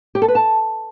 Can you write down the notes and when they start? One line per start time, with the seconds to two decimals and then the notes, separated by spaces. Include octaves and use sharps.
0.15 G4
0.22 A4
0.28 B4
0.35 A5